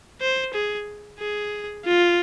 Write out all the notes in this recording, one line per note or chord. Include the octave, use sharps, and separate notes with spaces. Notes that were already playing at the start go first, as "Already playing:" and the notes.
C5
G#4
G#4
F4